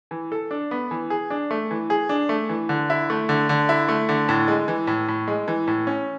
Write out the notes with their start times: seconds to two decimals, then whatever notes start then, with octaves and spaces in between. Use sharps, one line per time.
0.11 E3
0.32 A4
0.51 D4
0.71 B3
0.91 E3
1.10 G#4
1.30 D4
1.51 A3
1.71 E3
1.90 G#4
2.09 D4
2.29 A3
2.49 E3
2.69 D3
2.90 E4
3.10 A3
3.29 D3
3.49 D3
3.69 E4
3.89 A3
4.09 D3
4.29 A2
4.48 G#3
4.68 E3
4.87 A2
5.08 A2
5.28 G#3
5.48 E3
5.68 A2
5.87 C#4